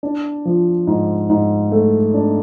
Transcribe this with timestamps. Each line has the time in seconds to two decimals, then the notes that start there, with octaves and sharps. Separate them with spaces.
0.03 D4
0.45 F3
0.87 G#2
1.30 G#2
1.72 A3
2.14 D4